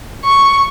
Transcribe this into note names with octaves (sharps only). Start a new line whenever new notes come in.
C#6